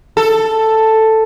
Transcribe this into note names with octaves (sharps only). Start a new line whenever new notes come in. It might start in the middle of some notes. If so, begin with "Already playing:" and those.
A4